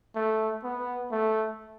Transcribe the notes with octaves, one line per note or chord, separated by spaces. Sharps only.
A3
B3
A3